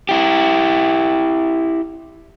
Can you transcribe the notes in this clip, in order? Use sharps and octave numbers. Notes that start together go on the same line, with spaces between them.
E4 G4